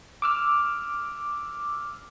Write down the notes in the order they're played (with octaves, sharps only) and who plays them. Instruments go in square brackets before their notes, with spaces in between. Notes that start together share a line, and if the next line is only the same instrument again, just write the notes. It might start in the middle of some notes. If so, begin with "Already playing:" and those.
[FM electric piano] D6 E6 F6